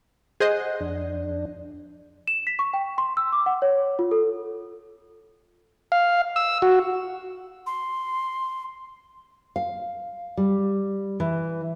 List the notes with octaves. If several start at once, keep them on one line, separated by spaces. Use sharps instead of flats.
G#4 C5 D#5 F#5
F2 D4
E7
B6
C#6
G5
C6
E6
D6
F#5
C#5
F4
A4
F5
E6
F#4
C6
F5
G3
E3